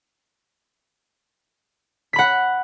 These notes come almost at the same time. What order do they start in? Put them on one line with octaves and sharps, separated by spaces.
B6 B5 F#5